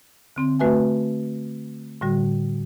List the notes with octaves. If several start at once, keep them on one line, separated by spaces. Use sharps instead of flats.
D3 C4 C6
A3 F#4 B4 E5 G#5
A2 D3 G3 F#4